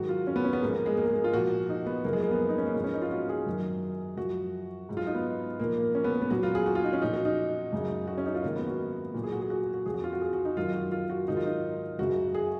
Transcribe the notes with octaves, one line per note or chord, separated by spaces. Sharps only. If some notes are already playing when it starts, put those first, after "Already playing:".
Already playing: G#2 D#3 F#3 F#4
F4
C#4
B3
C#4
B3
G#2 F3 A#3
A#3
G#3
A#3
G#3
A#3
F4
A#2 F3 F#4
D#4
B3
F#2 C#3 F3 A#3
G#3
A#3
B3
D#4
C#4
A#3
G#2 F3 B3
C#4
D#4
F4
F#4
G#4
F#2 D#3 F#3
F#2 F3 F#4
G#2 F#3
F4
D#4
B3
A#2 F3 A#3
A#3
C#4
B3
A#3
B3
A#2 F#3 F#4
F4
G#4
F#4
F4
D#4
C#4
A#2 F3 D#4
F#4
D#4
F#2 C#3 F#3
F#4
C#4
D#4
F4
G#2 D#3 F#3 A#3
B3
F#4
A#2 F#3
G#4
F#4
G#4
F#4
F#4
F2 F3 G#4
F#4
F4
F#4
G#4
F#4
D#4
F#2 D#3 F#3 F4
F#4
F4
F#4
G#2 D#3 F#3 D#4
F4
D#4
F#2 C#3 F#3 F#4
G#4